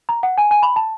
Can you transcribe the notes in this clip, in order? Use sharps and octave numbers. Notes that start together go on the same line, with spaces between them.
A#5
F#5
G#5
G#5
B5
A5